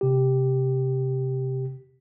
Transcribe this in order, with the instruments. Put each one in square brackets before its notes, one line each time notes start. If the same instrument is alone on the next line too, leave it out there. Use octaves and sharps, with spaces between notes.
[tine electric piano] C3 G4